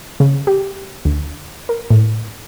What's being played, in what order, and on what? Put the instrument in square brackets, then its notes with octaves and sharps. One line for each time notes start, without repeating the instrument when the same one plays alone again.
[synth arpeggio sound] C#3
G4
D2
A#4
A2